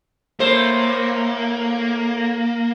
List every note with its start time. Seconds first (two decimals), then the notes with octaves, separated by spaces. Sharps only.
0.40 A2 A3 A#3 C5